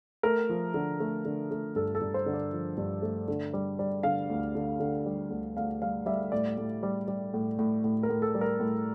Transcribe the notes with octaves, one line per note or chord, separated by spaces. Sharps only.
A3 A#4
F3
D3
A3
D3
A3
G2 A4
A4
G2
C5
D3
D5
F3
G2
A3
D3
G3
G3
D3 F5
D2
D3
D3
G3
D2
D2 F5
G3 F5
G3 E5
A2 D5
A2
G3
G3
A2
A2
A2
A#4
A2
A4
G3
A#4
A2